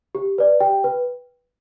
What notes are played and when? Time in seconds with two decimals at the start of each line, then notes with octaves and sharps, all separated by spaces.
0.15 G4
0.38 B4 D5
0.60 G4 G5
0.84 B4